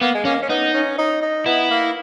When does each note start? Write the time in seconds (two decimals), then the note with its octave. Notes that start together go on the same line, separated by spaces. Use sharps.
0.01 A#3 B3
0.15 G#3
0.25 A#3 C#4
0.42 C#4
0.50 B3 D#4
0.74 C#4
0.98 D#4
1.22 D#4
1.46 B3 E4
1.71 A#3